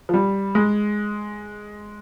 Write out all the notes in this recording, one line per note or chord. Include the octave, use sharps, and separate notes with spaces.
F3
G3
G#3